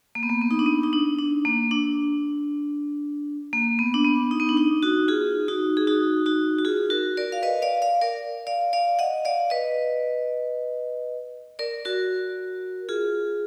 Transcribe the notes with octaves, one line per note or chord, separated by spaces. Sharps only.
A#3
B3
A#3
B3
D#4
D4
B3
D#4
D4
D4
A#3
D4
A#3
B3
D4
B3
D#4
B3
D4
D#4
D#4 F#4
F4 G#4
D#4 F#4
G#4
D#4 F#4
D#4 F#4
F#4
F4 G#4
F#4 A#4
A#4 D5
F5
B4 D#5
D5 F5
D5 F5
A#4 D5
D5 F5
D5 F5
D#5 F#5
D5 F5
B4 D#5
A#4 D5
F#4 A#4
F4 G#4